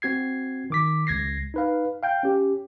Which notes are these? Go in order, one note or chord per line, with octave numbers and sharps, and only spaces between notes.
C4 F#4 G#6 C7
D#3 D6 B6
C#2 G#6 A#6 C7
D#4 B4 F5
F5 G5 G6
C#4 G4